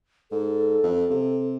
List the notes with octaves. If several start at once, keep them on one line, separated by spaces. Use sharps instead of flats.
G#2 A4
F2
C3